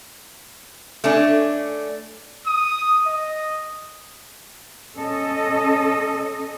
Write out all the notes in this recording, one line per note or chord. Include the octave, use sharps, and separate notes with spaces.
A3 C#4 D4
D#6
D#5
C#4 A4 D#5